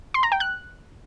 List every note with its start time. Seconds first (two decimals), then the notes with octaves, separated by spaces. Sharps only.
0.14 C6
0.23 A#5
0.32 G5
0.40 F#6